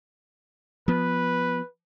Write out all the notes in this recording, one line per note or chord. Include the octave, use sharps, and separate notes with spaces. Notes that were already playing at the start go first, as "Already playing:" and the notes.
F3 B3 B4